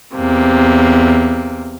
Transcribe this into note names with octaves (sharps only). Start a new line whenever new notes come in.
E2 C3 A#3